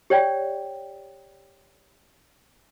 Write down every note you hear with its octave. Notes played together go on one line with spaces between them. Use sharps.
G4 C#5 D5 G5